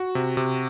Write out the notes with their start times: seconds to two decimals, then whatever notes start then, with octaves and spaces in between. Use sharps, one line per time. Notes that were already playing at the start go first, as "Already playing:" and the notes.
Already playing: F#4
0.15 C3
0.37 C3